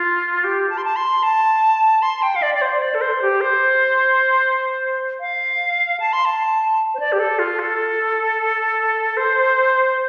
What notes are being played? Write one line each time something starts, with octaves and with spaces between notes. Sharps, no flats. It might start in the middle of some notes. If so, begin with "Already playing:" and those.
Already playing: F4
G4
A5
C6
A5
C6
A5
C6
G5
F5
D5
D5
C5
D5
A4
C5
G4
C5
F5
A5
C6
A5
C5
D5
G4
A4
F4
A4
C5